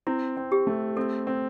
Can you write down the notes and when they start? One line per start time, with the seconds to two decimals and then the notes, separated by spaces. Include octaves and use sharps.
0.07 C4 E4
0.37 C4
0.52 G4
0.67 A3
0.97 C4 A4
1.27 C4